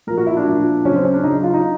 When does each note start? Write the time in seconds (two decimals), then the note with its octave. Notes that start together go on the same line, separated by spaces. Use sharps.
0.07 A#2 F3 A#4
0.17 F#4
0.27 E4
0.37 D4
0.47 A#2 F3
0.85 C#3 F#3 C#4
0.95 C4
1.05 C#4
1.14 D4
1.23 C#3 F#3 D#4
1.44 F4
1.54 D#4